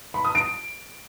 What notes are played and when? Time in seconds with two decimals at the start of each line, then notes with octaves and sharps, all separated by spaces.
0.14 B5
0.25 D#6
0.35 D7